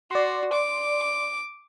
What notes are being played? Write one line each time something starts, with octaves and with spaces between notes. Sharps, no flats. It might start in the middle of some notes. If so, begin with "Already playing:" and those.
F#4 D5 C6
D6